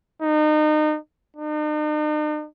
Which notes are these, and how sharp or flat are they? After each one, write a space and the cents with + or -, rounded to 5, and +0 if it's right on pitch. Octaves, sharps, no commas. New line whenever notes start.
D#4 -30
D#4 -45